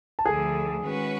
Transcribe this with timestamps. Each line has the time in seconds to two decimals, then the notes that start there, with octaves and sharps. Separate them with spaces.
0.19 A5
0.26 D2 D3 F3 G#4 G#5
0.83 D#3 G#3 C#4 F#4 B4